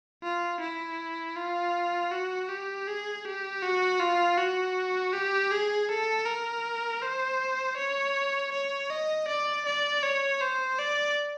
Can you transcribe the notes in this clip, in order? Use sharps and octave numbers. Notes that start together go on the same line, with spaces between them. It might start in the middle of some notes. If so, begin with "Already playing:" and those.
F4
E4
F4
F#4
G4
G#4
G4
F#4
F4
F#4
G4
G#4
A4
A#4
C5
C#5
C#5
D#5
D5
D5
C#5
C5
D5